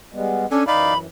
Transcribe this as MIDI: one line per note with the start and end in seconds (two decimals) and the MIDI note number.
0.13 0.46 55
0.13 0.46 56
0.13 0.46 59
0.51 0.67 61
0.51 0.64 62
0.51 0.64 69
0.51 0.64 80
0.67 1.07 42
0.67 1.07 52
0.67 0.94 63
0.67 0.94 74
0.67 0.94 77
0.67 0.97 83